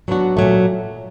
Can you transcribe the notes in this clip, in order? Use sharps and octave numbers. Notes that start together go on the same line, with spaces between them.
F#3 B3 D4 F#4
A#2 F#3 A3